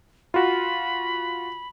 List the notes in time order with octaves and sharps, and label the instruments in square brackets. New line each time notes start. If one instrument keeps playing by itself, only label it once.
[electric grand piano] F4 F#4 [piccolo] B5